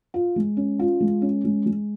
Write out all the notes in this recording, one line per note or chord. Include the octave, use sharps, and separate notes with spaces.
F4
G#3
C#4
F4
G#3
C#4
G#3
G#3